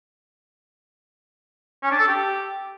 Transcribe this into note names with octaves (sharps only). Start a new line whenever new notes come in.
C#4
D4
A4
G4